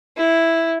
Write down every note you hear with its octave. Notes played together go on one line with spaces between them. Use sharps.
E4